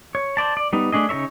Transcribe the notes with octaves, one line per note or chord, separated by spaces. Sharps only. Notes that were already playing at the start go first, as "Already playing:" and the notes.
C#5
C5 D5 A5
D5
G3 B3 D#4
A3 D4 G#4 D#5
C#3 D#4 A#4 C#5 E5